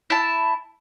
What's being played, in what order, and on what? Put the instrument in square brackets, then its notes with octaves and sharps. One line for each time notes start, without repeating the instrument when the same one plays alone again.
[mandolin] E4 A5